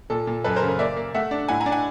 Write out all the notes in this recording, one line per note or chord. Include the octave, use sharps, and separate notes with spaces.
A#2 A4
A#2
F#2 A4 B4
A#4 C5
C#3
A#4
A#3 D5 E5
A#3
A3 E5 F#5
D4
A2 F#5 G#5
G#5 A#5
D4
F#5 G#5